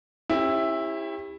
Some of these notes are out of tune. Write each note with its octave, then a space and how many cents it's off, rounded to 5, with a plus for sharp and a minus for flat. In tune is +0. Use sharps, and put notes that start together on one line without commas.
C#4 -35 E4 +0 G4 +25